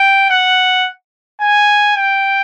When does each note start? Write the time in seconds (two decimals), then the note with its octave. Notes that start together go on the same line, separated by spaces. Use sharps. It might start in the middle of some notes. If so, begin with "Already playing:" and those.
Already playing: G5
0.30 F#5
1.41 G#5
1.96 G5